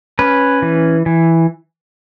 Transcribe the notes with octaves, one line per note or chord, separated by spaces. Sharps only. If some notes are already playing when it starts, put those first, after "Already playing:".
C#4 B4
E3
E3